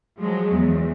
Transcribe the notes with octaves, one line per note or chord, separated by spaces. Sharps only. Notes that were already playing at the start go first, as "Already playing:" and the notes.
F3 F#3 G#3
E2